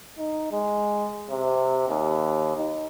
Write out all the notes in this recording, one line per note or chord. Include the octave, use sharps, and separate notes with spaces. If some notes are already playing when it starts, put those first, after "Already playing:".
D#4
G#3
C3
D#2
D#4